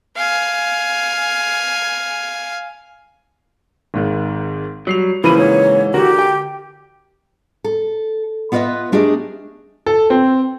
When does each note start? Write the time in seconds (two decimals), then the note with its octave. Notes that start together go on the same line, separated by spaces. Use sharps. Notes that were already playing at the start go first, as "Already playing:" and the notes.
0.17 F5 G#5
3.94 G#1 G#2 D#3
4.87 F#3 G3 C7 F7
5.24 C#3 E3 F3 A#3 B5 D#7
5.38 G#2 C#5
5.94 D3 F#4 G4 A#4
6.19 G5
7.64 A4
8.52 B3 F4 B4 C#5 D#5 E5
8.92 A3 D4 G4 G#4 A#4 D#5
9.86 A4
10.10 C4